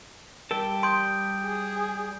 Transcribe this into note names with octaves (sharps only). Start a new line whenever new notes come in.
G3 A#4 G5 A5
C6 D#6 G6 D7
G#4